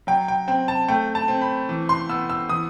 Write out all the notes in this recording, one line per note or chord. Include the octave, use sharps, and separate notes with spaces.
F#3 G5
G5
C4 G5
A5
A3 G5
A5
C4
B5
E3
C6
B3 E6
E6
E3 D#6